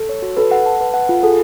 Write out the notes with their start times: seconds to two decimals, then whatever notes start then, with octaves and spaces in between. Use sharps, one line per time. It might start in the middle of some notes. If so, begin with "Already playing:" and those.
Already playing: A4
0.09 C#5
0.22 F#4
0.37 A4 B4
0.51 F#5
0.66 A5
0.81 B4
0.94 F#5
1.09 F4
1.23 G#4 A4